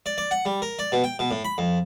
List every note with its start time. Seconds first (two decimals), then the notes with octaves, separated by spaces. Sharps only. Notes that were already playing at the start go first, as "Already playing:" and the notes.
0.06 D5
0.18 D5
0.31 F#5
0.45 G3
0.62 A#4
0.79 D5
0.92 B2
1.04 G5
1.19 B2
1.31 A2
1.45 B5
1.58 F2